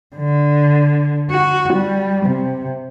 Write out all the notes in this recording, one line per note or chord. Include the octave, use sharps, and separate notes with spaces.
D3
F#4
G3
C3